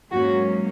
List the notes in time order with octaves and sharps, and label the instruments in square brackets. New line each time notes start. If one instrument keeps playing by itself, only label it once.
[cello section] G#2 F#3 A#3 C#4 F#4